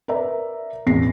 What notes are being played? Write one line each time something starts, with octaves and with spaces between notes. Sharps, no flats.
A#4 B4 D5 E5 A#5
A1 E2 B2 A#6 C7